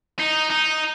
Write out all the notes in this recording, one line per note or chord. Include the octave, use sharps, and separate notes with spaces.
D#4
D#4